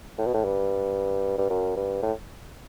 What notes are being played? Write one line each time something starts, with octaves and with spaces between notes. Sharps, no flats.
A2
B2
A2
G2
G2
F#2
G2
A2